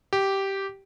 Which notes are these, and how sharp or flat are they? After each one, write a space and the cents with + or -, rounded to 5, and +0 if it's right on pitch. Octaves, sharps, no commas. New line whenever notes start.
G4 -10